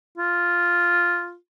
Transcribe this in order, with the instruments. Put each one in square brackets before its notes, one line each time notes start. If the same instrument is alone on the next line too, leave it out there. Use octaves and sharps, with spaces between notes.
[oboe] F4